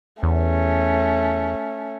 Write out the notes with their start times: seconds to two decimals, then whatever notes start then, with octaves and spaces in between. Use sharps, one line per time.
0.23 E2 A3 C#4